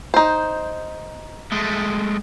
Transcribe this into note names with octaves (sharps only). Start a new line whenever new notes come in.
D#4 C5
G#3 A3